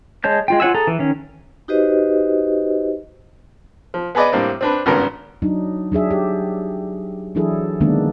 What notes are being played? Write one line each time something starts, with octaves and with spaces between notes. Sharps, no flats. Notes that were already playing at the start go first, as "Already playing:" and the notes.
G#3 C#5 A5 G6
G#3 F4 G5
F4 C#5 F#5 G#5 E6
G#4 A4 A#5
E3
D#3 C#4
D#4 F#4 G4 B4 C5 D#5
F3
B3 G#4 B4 D5 D#5
A2 G3 A#3 C4 D4
C4 D4 B4
G#1 G2 C#3 B3 A#4
F#3 D4 D#4
F#3 D4 G#4 E5
G4
E3 F#3 D4 E4 G#4 A4
D3 D#3 G#3 A#3 B3 D4